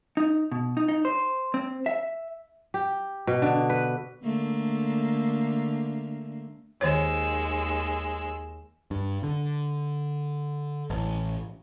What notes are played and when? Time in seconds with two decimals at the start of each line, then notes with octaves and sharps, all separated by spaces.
0.17 D#4
0.52 B2
0.77 D#4
0.88 D#4
1.05 C5
1.54 C4
1.86 E5
2.74 G4
3.27 B2
3.42 D3
3.70 B4
4.23 D3 A3 A#3
6.81 D#2 D#3 G#3 C5 C#5 E6
8.91 G2
9.23 D3
10.90 A1